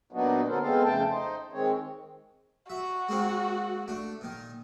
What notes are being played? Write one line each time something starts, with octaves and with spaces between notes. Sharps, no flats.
A#2 F#3 B3 D4 D#4 F#4
D3 B3 C#4 A4 A#4 C5
G#3 B3 C4 A4 C5 F5
F2 C#3 A3 G5 A5
D#4 C5
D#3 G#3 C4 C#5
F#4 E5
G#3 A#3 C4
A3 D4
A#2 D#3